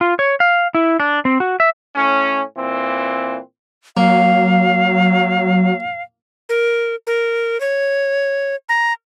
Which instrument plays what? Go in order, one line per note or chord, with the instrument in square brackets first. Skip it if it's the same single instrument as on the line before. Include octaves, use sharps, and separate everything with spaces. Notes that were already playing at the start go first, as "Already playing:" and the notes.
[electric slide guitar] F4
C#5
F5
E4
D4
C4
F#4
E5
[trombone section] A2 C#4
A#2 E3 C4
[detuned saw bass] F#3 [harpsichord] A#3 [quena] F5
[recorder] A#4
A#4
C#5
A#5